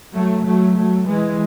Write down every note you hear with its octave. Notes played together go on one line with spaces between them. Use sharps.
F#3 A3
F#3 A3
F#3 A3
E3 G#3